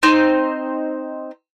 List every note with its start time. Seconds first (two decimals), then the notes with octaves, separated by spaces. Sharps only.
0.03 C4 D#4 C5